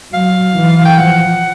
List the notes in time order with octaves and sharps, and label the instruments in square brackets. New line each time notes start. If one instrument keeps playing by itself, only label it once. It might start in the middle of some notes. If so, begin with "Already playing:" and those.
[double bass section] F#3 [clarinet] F5
[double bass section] E3
[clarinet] G5
[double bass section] F3 [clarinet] F#5